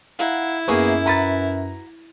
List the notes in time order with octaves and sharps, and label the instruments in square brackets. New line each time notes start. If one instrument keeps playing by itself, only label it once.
[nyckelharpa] E4 [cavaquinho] F5 F#5 A#5
[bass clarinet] F#2 [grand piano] A#3 B3 G#4 [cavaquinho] D#5 A#5 C#6
[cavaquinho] F#4 B4 [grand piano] A#5 A6